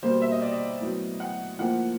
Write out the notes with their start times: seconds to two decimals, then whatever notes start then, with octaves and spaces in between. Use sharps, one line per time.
0.03 B2 G3 A#3 C5
0.22 E5
0.32 D#5
0.42 D5
0.52 D#5
0.81 A2 F#3 B3
1.20 F#5
1.59 A2 F3 A#3 F#5